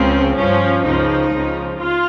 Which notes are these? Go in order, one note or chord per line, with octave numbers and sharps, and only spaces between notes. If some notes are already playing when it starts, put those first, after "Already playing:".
Already playing: C#2 C#3 F3 C4
G2 F3 C#4
C#2 C#3 F3 D#4
C#2 C#3 F3
F4